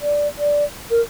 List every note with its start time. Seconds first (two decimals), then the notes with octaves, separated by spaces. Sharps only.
0.02 D5
0.39 D5
0.91 A#4